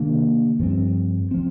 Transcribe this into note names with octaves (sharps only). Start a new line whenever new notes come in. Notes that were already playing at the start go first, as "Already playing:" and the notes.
Already playing: C3 D#3 A#3 D4
G2 F3 C4
F3 C4